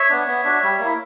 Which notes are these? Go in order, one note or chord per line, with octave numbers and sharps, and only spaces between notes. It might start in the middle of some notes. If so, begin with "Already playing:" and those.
Already playing: C#5 E5
B3 D4
B3
D4 F#4
G3
A#3 E4